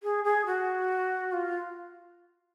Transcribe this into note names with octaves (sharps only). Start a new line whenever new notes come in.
G#4
G#4
F#4
F4